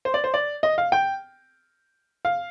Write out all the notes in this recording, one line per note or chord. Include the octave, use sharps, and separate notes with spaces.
C5
D5
C5
D5
D#5
F5
G5
F5